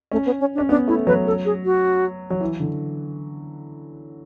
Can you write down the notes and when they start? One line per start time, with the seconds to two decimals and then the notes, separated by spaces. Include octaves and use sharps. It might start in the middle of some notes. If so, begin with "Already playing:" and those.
0.12 A3 C#4
0.26 B3
0.40 C#4
0.55 D4
0.58 C#4
0.69 B3 D4
0.88 A3 E4
1.07 F#3 B4
1.26 A4
1.45 G#4
1.65 F#4
2.30 F#3
2.41 E3
2.60 D3